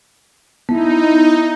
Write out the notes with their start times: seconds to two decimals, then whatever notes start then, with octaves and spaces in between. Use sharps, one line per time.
0.69 B3 D#4 E4